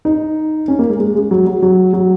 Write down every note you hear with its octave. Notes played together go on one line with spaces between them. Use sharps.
D#4
C#4
A#3
G#3
G#3
G#3
F#3
F#3
F#3
F#3